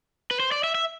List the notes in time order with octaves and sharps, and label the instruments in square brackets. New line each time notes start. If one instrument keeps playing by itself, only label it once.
[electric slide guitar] B4
C5
D5
E5
E5